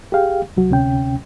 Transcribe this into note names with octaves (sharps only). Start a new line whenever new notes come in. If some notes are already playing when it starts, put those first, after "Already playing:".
G4 G#4 F5 G5
C2 F#3 F#4
D2 C3 C#4 G5